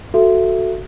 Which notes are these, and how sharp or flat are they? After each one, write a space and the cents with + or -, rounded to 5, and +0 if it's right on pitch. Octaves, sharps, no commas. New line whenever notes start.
F#4 +0 A4 +5 E5 +20